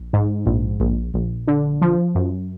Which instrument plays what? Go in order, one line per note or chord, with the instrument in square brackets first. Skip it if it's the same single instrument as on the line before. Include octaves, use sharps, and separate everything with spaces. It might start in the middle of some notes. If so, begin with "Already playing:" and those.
Already playing: [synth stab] A#1
G#2
A#1
A#1
A#1
D3
F3
F#2